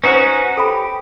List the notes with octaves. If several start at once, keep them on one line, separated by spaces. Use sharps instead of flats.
C#4 D#4 F#4 B4 C5
G4 A4 G5 B5